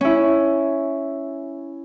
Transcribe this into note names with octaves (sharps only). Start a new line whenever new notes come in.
C#4 E4